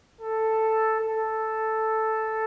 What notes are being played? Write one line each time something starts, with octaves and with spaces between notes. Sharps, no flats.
A4
A4